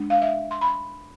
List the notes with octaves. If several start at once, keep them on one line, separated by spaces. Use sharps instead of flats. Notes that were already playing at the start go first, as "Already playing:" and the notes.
Already playing: G#3 D4
F5
E5
C6
B5